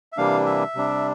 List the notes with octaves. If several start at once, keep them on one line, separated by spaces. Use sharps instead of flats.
E5
C3 E3 G3 A#3 D4 F5
E5
C3 G3 D4